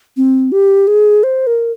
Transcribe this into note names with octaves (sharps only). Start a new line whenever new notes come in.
C4
G4
G#4
C5
A#4